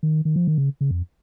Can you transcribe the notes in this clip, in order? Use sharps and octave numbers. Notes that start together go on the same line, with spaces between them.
D#3
D#3
F3
D#3
C#3
C#3
F2